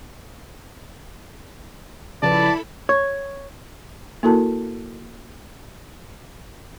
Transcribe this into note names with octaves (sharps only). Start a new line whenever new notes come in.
C#3 F3 E4 A4 B4 D5 A5 B5
C#5
A#3 E4 F#4 A4 A#4 A5